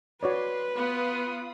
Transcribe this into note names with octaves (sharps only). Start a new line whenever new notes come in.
F#4 B4 C#5 D5 C6
B3 F4 B5 D#6